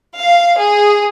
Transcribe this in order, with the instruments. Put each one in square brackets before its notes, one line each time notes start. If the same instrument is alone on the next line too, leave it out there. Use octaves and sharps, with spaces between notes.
[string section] F5
G#4